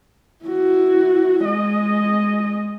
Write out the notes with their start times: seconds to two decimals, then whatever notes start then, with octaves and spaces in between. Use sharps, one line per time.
0.45 E4 F#4
1.45 G#3 D#5